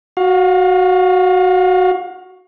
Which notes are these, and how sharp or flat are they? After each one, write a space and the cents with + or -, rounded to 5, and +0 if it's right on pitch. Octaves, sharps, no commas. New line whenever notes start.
F#4 +0 F5 +30